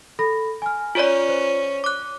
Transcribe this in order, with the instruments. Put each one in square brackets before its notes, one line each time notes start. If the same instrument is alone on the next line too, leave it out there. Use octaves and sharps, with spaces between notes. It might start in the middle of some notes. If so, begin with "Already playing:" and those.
[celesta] A4 B5 A#6
G#5 F6
[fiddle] C#4 [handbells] F4 C#5 D5
[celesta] C5
[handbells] D6 F#6